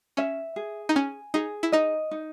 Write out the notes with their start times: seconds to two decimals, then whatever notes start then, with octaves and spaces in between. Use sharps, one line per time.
0.17 C#4 E5
0.56 G#4
0.89 D#4
0.95 C#4 G#5
1.34 D#4 G#4
1.63 E4
1.72 D#4 D#5
2.11 D#4